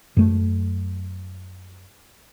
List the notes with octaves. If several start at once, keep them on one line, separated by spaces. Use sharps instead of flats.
F#2 A3